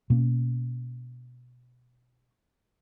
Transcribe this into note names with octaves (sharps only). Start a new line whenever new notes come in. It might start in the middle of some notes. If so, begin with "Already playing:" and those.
B2 A#3 C#4